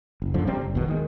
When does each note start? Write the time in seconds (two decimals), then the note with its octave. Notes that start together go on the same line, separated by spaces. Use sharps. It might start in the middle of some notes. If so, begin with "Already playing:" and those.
0.22 F#1
0.34 F#2 D3 F3
0.47 C3 G3 C4 D4
0.61 F#1
0.75 D#2 B2 D#3
0.88 D#3 G#3